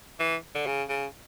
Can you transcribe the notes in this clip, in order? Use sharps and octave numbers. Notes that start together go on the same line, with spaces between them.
E3
D3
C#3
C#3